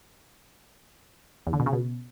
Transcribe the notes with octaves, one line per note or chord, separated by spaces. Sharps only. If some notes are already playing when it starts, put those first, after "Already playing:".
E2
D3
B2
C#3
B2